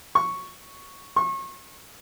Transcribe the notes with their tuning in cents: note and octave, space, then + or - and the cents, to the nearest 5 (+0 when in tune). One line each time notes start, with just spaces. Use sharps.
C#6 +0
C#6 -35